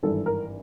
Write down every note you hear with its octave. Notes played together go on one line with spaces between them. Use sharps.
G#1 G2 E3 A4
A#4